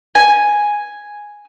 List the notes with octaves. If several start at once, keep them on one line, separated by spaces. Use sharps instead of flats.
G#5